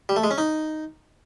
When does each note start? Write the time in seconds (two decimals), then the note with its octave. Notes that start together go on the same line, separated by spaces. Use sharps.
0.09 G3
0.16 A3
0.24 G#3
0.31 C#4
0.38 D#4